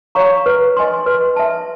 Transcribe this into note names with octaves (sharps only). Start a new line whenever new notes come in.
C#5 F5 A#5 C#6
B4
D#5 G#5 C6
B4
E5 A5